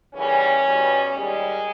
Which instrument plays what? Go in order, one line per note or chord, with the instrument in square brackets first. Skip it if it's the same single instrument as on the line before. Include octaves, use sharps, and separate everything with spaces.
[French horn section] D#2 C#3 E3 G3 C#4
E2 B2 G3
D#2 D#3 G3 G#3